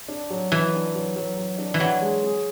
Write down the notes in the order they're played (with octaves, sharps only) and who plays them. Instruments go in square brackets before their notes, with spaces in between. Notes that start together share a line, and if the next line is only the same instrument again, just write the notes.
[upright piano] D4
F#3
[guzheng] E3 [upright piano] F#3
[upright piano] D4
F#3
F#3
F#3
D4
[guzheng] E3
[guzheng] F#3 [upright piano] D4
[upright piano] G#3
G#4